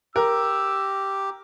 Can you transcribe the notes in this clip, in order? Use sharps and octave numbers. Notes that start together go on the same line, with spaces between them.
G4 A#4 E6